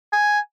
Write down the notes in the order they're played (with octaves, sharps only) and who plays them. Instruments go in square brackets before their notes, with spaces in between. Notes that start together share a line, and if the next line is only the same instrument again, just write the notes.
[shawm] G#5